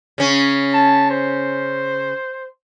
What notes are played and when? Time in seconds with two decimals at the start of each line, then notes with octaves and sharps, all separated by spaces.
0.18 C#3 C#4
0.73 A5
1.11 C5